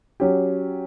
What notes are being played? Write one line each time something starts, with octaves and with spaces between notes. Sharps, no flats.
F#3 C#4 G4